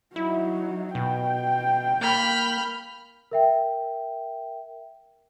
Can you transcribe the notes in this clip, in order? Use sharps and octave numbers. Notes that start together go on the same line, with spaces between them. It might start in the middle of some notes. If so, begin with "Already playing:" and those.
F#3 D#4 E4
B2 G5
A#3 B5 F6 G6
A#4 E5 G5